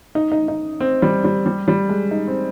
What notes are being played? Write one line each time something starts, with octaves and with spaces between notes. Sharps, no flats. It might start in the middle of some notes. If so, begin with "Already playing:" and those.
D#4
D#4
D#4
C4
G3
G3
G3
G3
G#3
D#4
C4